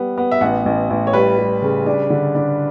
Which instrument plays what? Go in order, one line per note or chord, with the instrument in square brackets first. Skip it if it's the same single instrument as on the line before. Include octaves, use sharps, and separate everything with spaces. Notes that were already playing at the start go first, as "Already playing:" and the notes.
Already playing: [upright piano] G3 B3
B3
E5
A1 F#5
A1
A1
C#5
G3 B4
G3
C#3
D4
D3
D4